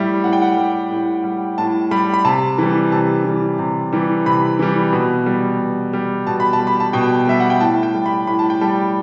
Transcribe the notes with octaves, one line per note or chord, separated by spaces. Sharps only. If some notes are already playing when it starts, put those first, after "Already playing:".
Already playing: A2 G3 E5
A2 F#5
G5
F#5
G3
A2
G3
A2 A5
G3 B5
B5
C3 A5
E3 G3
C3 A5
E3 G3
C3
E3 G3
C3 B5
E3 G3
B2
G3
B2
G3
B2 A5
B5
A5
G3
B5
A5
B2 G5
G3 E5
F#5
G5
A2 A5
G5
G3
B5
A2 B5
A5
G5
G3 A5